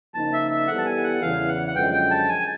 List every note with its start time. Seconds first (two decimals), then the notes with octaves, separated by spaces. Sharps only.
0.14 C#3 F3 A#3 D#4 A5
0.33 E5
0.51 E5
0.68 E3 G3 B3 E4 A4 F#5
0.78 A5
0.86 G#5
1.03 F#5
1.21 E2 C#3 E3 F5
1.48 F#5
1.67 F#5
1.75 F#2 D3 F3 G#3 C#4 G5
1.94 G5
2.11 A5
2.29 G#5